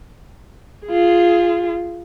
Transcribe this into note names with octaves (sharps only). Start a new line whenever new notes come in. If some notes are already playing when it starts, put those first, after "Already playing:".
F4 G#4